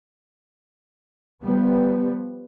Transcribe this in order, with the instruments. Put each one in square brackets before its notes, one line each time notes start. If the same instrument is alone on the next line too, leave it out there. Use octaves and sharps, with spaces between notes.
[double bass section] F3 G3 B3